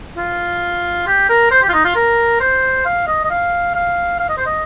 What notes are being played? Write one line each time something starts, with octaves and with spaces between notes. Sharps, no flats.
F4
G4
A#4
C5
G4
F4
D#4
F4
A#4
C5
F5
D#5
D#5
F5
F5
F5
D#5
C5
D#5